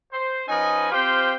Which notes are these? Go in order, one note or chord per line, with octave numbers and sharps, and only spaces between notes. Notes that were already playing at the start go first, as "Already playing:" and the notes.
C5
F3 C#4 D#4 B4 D#5 G#5
C4 F4 G4 C5 F5 G5